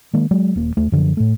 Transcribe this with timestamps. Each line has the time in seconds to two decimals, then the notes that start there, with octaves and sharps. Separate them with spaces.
0.14 D#3 G#3 A#3
0.31 F#3 G#3
0.55 D#1 A#3
0.77 D#2 A3
0.92 F#2 D3 F3
1.17 A2 A3